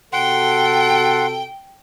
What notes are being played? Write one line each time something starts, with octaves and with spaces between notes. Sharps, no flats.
C3 F#4 A4 F#5 G5 C6